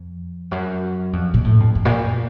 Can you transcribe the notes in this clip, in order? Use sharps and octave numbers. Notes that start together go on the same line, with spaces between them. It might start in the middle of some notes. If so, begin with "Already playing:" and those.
Already playing: F2
F#2
F2
A#2
A2
F2
F#2
A#2